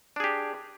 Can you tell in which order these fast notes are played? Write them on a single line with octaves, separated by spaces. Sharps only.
D4 G#4 G4